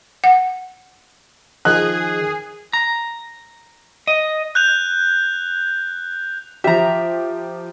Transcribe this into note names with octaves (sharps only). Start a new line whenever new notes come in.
F#5
D#3 F3 G#4 D#5 F#6
A#5
D#5
F#6 G6 F7
F3 G4 E5 A#5